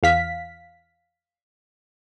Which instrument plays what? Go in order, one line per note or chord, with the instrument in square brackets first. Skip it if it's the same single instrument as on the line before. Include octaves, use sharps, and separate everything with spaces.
[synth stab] E2 F5 B6